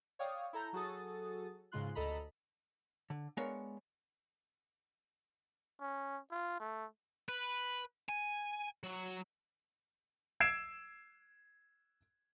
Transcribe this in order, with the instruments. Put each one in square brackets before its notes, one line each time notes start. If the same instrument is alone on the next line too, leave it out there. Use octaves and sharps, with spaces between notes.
[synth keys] C#5 D5 F5 G5 D#6
E4 A4 A#5 G6
F#3 F#4 G#4 A4 D#6 A6
G#2 C#3 G#3 F4 C6 F#6
D2 A4 D#5 A#5 B5
[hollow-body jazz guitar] D3
G#3 B3 D4 A#4 C#5 F5
[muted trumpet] C#4
F4
A3
[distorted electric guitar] B4
G#5
F#3
[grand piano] E6 G#6 C7 D7 E7